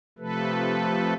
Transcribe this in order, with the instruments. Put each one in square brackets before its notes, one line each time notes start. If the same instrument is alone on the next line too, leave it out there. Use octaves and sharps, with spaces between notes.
[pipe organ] C3 F3 A3 A4 B4